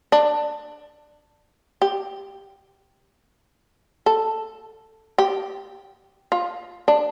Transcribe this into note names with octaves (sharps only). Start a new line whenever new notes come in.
D4
G4
A4
G4
F4
D4